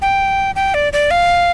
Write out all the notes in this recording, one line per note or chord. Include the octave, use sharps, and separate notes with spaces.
G5
G5
D5
D5
F5